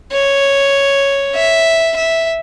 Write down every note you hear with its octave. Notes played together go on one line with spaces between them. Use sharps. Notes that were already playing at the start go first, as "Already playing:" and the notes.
C#5
E5
E5